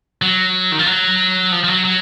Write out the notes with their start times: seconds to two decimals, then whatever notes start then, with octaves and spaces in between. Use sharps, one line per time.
0.22 F#3
0.72 D#3
0.79 F3
0.87 F#3
1.52 F3
1.64 F3
1.68 F#3
1.85 F#3